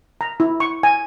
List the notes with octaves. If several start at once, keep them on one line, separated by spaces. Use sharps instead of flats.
A#5
E4
C#6
G#5